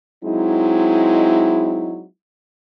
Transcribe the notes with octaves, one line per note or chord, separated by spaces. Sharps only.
F#3 G#3 C4 D#4 E4